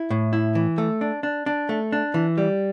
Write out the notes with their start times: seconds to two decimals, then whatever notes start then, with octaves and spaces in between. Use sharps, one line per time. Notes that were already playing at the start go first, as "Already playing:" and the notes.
Already playing: E4
0.10 A2
0.33 E4
0.55 E3
0.78 A3
1.01 D4
1.23 D4
1.46 D4
1.69 A3
1.92 D4
2.14 E3
2.38 G3